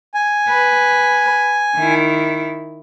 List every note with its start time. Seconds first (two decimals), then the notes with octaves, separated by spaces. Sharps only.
0.14 G#5
0.48 B4
1.77 D#3 E4